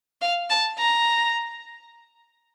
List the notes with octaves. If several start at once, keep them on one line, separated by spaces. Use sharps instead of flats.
F5
A5
A#5